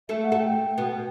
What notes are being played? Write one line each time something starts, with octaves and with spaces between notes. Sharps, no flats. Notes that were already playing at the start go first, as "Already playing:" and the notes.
A3 A4 E5
F#5
A3 A4
G5
B2 B3